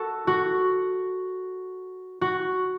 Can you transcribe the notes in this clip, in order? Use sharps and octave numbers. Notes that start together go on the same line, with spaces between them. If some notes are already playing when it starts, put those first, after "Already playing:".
Already playing: F#4 A4
F#4
F#4